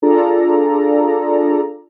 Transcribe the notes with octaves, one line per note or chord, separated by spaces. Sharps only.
D4 F4 G#4 A4 D5 A#5